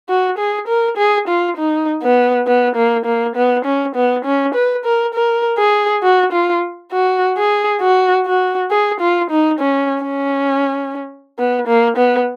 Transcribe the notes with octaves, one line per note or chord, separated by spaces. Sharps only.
F#4
G#4
A#4
G#4
F4
D#4
B3
B3
A#3
A#3
B3
C#4
B3
C#4
B4
A#4
A#4
G#4
F#4
F4
F#4
G#4
F#4
F#4
G#4
F4
D#4
C#4
C#4
B3
A#3
B3